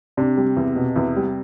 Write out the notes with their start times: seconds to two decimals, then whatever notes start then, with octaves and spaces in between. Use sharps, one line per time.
0.17 C3 D4
0.37 G3
0.57 E2
0.76 B2
0.96 E2
1.16 G3